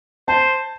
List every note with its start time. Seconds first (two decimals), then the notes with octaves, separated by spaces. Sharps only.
0.28 C5 A5